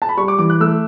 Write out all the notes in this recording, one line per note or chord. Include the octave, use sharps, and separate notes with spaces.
A5
B5
G3 C#6
D6
E3 D6
F#6
A3 E6